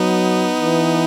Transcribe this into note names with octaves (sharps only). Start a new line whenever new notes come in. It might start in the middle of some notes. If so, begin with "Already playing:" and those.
Already playing: F#3 B3 D#4
E3